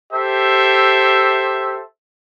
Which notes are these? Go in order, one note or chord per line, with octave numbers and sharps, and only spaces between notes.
G4 A4 C5 E5